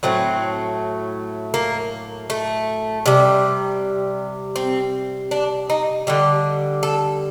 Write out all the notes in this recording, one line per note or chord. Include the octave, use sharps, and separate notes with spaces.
A2 F#3 A3 C4
A#3
A3
C3 G3
C4
D4
D#4
D3 G3 G4
A4